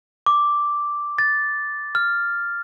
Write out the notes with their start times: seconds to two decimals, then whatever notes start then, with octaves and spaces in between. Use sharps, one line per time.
0.26 D6
1.19 A6
1.95 F6